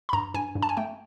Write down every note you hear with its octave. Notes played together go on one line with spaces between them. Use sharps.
B5
G2 A#5
G2 G#5
G2
A5
G#5
A3 G5